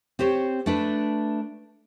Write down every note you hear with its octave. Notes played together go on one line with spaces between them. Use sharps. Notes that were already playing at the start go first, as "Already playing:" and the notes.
C4 G4 C5 C#5
A3 D4 B4